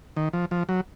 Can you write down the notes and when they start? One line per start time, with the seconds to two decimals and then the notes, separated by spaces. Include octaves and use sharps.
0.17 D#3
0.33 F3
0.51 F3
0.69 F#3